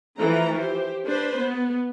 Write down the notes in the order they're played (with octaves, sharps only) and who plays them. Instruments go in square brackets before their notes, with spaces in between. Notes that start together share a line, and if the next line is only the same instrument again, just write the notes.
[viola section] E3 F3 A3 A#5
G4 C5
D4 B4 C5
B3